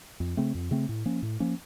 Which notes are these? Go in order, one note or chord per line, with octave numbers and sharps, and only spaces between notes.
F2
C#3 A3 C4
F2
C#3 A3 C4
A2
F3 A#3 C#4
A2
F3 A#3 C#4